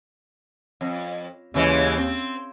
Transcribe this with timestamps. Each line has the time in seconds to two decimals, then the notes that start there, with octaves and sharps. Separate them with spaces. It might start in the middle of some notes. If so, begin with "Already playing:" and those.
0.81 F2
1.54 D#2 C#3 E3 G#3
1.97 C4